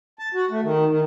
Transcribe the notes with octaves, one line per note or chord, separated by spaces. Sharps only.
A5
F#4
A3
D#3
D#3